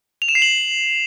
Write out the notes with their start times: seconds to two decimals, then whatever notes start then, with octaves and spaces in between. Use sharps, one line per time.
0.22 F7
0.28 E7
0.35 C7
0.42 F#7